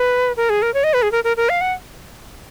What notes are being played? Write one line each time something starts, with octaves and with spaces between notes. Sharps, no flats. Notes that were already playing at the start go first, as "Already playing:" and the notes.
Already playing: B4
A#4
G#4
A#4
C#5
D#5
B4
G#4
A#4
A#4
A#4
F5
F#5